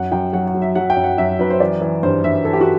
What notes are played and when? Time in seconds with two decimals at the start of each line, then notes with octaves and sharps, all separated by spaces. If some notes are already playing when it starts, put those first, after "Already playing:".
Already playing: F#2 F#5
0.11 F#2 G5
0.33 F#3 F#5
0.47 F#5
0.55 F#3
0.62 E5
0.75 F#3 F#5
0.90 G5
0.96 F#2
1.04 F#5
1.18 F#2 E5
1.39 F#2 B4
1.50 C5
1.60 E3 D5
1.81 E3
2.03 G2 C5
2.24 G2 E5
2.45 E3 A4
2.53 G4
2.61 F#4